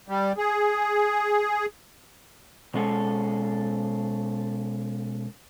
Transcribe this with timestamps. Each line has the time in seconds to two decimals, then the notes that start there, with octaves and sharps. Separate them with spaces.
0.09 G3
0.38 G#4
2.74 B2 G#3 C#4 A4